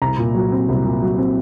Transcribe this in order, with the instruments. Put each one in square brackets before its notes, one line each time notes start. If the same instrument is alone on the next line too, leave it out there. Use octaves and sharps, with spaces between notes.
[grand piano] C2 A#5
A#2
F#3
C4
C2
A#2
F#3
C4